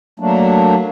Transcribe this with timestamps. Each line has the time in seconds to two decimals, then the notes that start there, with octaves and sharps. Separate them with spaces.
0.20 F#3 A3 A#3 D4